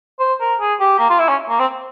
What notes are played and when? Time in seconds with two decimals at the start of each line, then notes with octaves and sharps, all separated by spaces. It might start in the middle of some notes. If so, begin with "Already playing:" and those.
0.20 C5
0.41 A#4
0.61 G#4
0.80 G4
0.99 A#3
1.10 F4
1.19 E4
1.29 C#4
1.49 A#3
1.59 C4